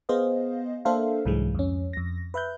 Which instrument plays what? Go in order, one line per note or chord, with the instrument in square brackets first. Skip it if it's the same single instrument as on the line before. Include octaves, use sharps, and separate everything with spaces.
[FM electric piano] B3 G#4 C5 D#5 F5
A#3 D4 A4 C5 E5 F5
C2 G#2 E3 F#3 G#3
F2 C#4
F2 A#6
B4 E5 F#6 G6